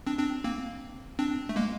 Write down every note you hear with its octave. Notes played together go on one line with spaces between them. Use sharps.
C4 D4
C4 D4
A#3 C4
C4 D4
A3
G#3 A#3